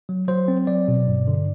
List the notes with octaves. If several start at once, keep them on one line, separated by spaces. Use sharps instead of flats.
F#3
F#3 C5
C4
F#3 D5
B2
G2
D3